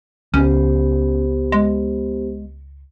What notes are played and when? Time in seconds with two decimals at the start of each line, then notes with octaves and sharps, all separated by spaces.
0.34 C#2 B3 C#4 G4 C5
1.52 G#3